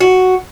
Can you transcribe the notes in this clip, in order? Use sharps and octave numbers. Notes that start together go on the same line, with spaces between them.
F#4